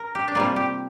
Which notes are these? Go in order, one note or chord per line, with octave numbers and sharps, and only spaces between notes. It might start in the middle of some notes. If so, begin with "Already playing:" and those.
Already playing: A#4
G4
D4
C3 G3 A#3 F4
G4